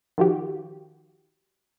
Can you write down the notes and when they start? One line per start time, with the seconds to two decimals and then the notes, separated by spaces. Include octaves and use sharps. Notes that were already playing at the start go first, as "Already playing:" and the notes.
0.18 D#3 F3 F#4 G4